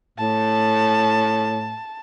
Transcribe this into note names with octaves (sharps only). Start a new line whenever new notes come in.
A2 A5